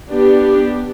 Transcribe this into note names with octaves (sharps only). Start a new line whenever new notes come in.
B3 D4 G4